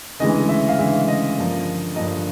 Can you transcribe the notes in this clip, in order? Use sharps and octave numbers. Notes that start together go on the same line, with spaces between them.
D2 C#3 E3 G#3 D#5
E5
F5
D2 C#3 E3 G#3 E5
D#5
G2 D3 F3 A#3
G2 D3 F3 A#3 D#5